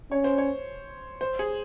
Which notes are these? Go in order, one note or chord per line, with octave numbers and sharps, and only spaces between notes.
C#4 C#5
C5
C#5
C5
G#4